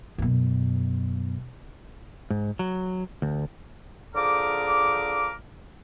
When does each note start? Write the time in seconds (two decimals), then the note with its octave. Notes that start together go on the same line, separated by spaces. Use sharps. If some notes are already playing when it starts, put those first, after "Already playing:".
0.18 F#2 B2
2.30 G#2
2.59 F#3
3.22 D2
4.15 D3 F3 G#4 A#4 D6